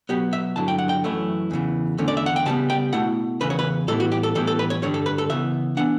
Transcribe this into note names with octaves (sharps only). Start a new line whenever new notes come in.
B2 F#3 B3 G4
E5
G2 D3 F#3 E4 A5
G5
F#5
G5
F#2 E3 A3 C#4 E4
E2 C#3 E3
E2 D3 A3 C#4
D5
E5
F#5
G5
C#3 G3 B3 A5
G5
B2 A3 E4 F#5
E2 C#3 E3 B4
C#5
B4
A2 E3 G3 B3 E4 A4
F#4
G4
A4
A2 E3 G3 B3 E4 A4
A4
B4
C#5
G2 D3 G3 C#5
A4
B4
A4
C#3 E3 B3 E5
E3 B3 D4 F#5